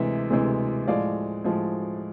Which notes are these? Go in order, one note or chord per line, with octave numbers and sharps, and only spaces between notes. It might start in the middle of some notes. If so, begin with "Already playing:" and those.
Already playing: D2 C3 E3 G#3 E5
D2 C3 E3 G#3
A2 F3 G#3 D5 F5
A2 F3 G#3